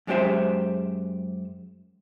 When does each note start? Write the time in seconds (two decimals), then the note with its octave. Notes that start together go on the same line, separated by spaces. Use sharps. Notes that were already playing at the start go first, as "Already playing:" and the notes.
0.07 F#2 G#3 D4 G4 C5 E5